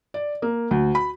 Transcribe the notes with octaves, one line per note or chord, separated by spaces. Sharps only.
D5
A#3
D2
B5